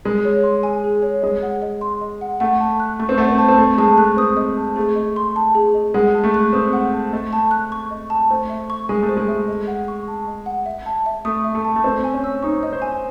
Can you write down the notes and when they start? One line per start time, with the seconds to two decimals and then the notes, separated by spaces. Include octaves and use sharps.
0.05 G#3 G#4
0.25 C#5
0.44 C6
0.63 G#5
0.84 G#4
1.02 C#5
1.22 G#3 D#5
1.43 F#5
1.62 D#5
1.81 C6
2.01 D#5
2.21 F#5
2.40 A3 F#5
2.60 A5
2.80 F#6
2.99 A3 C#6
3.09 C4
3.18 A3 F#5
3.29 C4
3.38 A5
3.49 C4
3.58 A3 D#5
3.78 G#3 A5
3.98 A3 F#6
4.17 C4 D#6
4.37 D#5
4.57 A5
4.76 A3 G#4
4.96 D#5
5.16 C6
5.36 A5
5.55 G#4
5.74 D#5
5.94 G#3 F#5
6.14 A5
6.24 A3
6.34 F#6
6.53 C4 D#6
6.73 F#5
6.93 A5
7.13 A3 D#5
7.33 A5
7.51 F#6
7.72 C#6
7.91 D#5
8.10 A5
8.31 A3 C5
8.49 E5
8.70 C#6
8.89 G#3 G#5
9.03 A3
9.09 C5
9.17 G#3
9.28 E5
9.48 D#5
9.67 F#5
9.88 C#6
10.08 A5
10.27 D#5
10.46 F#5
10.66 E5
10.86 A5
11.06 E5
11.25 A3 D#6
11.44 E5
11.55 A3
11.65 A5
11.76 A3
11.84 C4 D#5
12.04 G#5
12.14 C#4
12.24 E6
12.43 D#4 C#6
12.63 D#5
12.73 C5
12.82 G#5